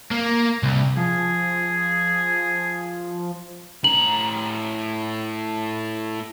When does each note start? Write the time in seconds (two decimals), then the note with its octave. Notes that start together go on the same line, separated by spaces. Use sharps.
0.11 A#3
0.63 C2
0.97 F3 G#4
3.84 A2 A#5 F#7